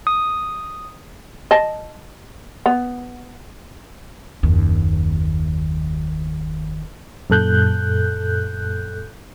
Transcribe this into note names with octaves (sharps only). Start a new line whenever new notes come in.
D#6
D#5 A5
B3
F#1 D#2
F#2 A#2 A4 F#6 G6